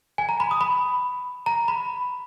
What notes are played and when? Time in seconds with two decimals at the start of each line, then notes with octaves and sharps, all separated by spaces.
0.18 G#5
0.29 A#5
0.40 B5
0.51 D#6
0.61 B5
1.46 A#5
1.68 B5